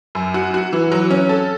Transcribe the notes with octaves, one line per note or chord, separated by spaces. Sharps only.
F#2
F#4
F#4
E3
F#3
C#4
A4